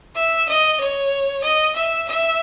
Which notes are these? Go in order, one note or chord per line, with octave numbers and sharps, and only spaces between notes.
E5
D#5
C#5
D#5
E5
E5